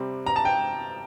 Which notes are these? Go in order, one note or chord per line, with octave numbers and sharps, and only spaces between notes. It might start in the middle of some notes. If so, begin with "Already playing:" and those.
Already playing: C3 G3 C4
A#5
A5
G5